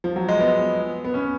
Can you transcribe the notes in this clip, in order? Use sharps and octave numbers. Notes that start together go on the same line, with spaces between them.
F3
F#3
G#3
B3
B3
C#4